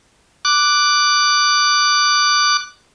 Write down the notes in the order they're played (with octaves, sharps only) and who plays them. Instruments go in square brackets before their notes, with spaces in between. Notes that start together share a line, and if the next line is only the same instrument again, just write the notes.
[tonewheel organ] D6 F#6